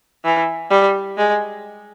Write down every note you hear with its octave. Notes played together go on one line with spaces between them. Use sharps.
E3
G3
G#3